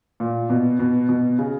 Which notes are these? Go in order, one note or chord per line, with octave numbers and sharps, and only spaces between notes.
A#2
B2
B2
B2
C#3